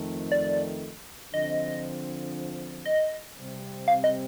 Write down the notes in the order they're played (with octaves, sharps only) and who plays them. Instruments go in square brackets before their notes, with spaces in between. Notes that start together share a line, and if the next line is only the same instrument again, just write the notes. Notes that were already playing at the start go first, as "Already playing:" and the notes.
Already playing: [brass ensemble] F2 D#3 A3
[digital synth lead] D5
[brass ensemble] D3 F3 C4 [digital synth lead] D#5
[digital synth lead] D#5
[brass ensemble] C3 G3 C4
[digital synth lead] F5
D#5